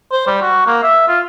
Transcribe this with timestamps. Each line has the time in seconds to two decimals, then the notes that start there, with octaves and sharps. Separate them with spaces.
0.12 C5
0.27 G3
0.42 F#4
0.67 A#3
0.83 E5
1.08 F4